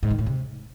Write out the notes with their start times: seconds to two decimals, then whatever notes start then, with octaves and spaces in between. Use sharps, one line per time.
0.03 G#2
0.11 D#3
0.19 A2
0.26 C3